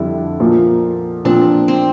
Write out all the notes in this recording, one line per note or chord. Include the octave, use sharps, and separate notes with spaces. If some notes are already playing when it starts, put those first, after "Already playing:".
Already playing: F2 D3 G3 D4 E4
A#2 F3 A#3
A#2 F3 C4 D4
C4